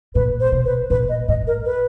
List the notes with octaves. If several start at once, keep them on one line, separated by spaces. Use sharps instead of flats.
A#2 B4
C5
B2
B4
A#2 B4
D#5
A2 D#5
A#4
B4